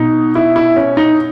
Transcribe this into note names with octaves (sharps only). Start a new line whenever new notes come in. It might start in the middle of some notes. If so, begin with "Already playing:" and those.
Already playing: B2 D#4
E4
E4
C#4
D#4